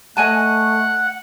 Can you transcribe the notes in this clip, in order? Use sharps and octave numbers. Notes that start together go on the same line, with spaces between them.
A3 D#5 F#5 G#5 A5